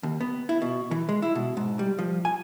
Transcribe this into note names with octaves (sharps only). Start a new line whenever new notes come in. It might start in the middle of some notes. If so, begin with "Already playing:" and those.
D#2
B3
E4
B2
E3
G#3
E4
B2
G#2
G3
F3
G#5